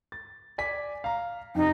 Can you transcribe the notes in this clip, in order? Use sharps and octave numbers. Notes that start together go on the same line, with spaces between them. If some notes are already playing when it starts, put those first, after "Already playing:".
A6
D5 G#5 B6
F5 A#5
F2 C3 D#4